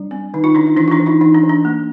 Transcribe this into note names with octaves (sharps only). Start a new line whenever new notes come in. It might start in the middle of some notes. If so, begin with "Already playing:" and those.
Already playing: G3 D4
C4
D#3 D#4
D#4 F4
D#3 D4 E4
D#4
E3 D4 E4
F4
D4 E4
E3
D#4 F4
E3 D#4
D4
E3
D4
A#3